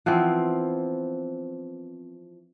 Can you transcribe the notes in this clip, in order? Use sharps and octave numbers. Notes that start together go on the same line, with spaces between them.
E3 F3 B3 C4